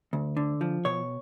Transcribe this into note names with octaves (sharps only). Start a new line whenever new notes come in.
D2
D3
F3
B2 C#5